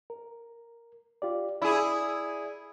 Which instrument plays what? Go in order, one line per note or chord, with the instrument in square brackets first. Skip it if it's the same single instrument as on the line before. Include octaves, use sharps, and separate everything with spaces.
[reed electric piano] A#4
F4 G4 D5
[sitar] E4 G#4 [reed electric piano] D5 B5 E6